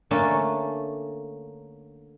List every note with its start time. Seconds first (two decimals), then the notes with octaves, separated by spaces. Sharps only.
0.11 D3 A3 A#3 C#4 A4